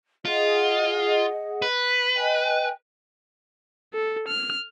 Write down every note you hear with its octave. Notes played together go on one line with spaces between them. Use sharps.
F4 G#4 D#5 F#5
B4
D#5 G5 G#5
A4
F6